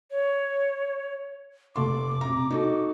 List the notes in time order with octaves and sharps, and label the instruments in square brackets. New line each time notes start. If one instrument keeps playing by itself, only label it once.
[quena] C#5
[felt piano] F1 A4 C6 [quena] D6
[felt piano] C3 A#5
D#4 F#4 A4